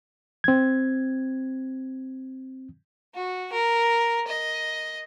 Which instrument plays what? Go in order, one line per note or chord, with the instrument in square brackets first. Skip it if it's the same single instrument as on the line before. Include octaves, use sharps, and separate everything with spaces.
[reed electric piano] C4 G#6
[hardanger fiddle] F#4
A#4
D#5